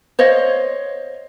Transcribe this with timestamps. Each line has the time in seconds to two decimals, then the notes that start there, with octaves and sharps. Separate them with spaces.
0.19 C5 C#5 D#5 F5